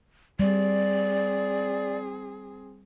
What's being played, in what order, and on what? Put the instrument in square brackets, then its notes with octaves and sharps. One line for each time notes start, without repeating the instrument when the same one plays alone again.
[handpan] G3 [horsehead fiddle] C4 G#4 [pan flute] D5